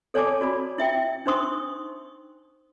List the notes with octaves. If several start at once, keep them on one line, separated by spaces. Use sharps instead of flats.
A4 C#5 D5 G#5 A5 D6
F#4 D5 B5
E4 E5 G5
D4 D#4 C5 C6 C#6 D#6